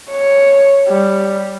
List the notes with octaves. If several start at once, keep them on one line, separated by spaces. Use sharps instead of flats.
C#5
G3